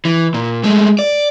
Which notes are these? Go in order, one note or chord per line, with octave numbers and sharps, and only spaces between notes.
E3
A#2
G#3 A3
D5